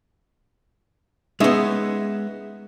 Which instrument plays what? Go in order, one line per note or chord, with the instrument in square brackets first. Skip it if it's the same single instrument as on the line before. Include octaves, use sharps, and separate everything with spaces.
[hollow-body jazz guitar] G#3 B3 [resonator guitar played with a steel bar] C#4 D#4 E5